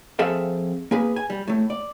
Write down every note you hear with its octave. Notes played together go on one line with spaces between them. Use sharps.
F2 C4 G#4 A4 E5 F5
A#3 G#4 B4
G#5
G3
A2 A3
D5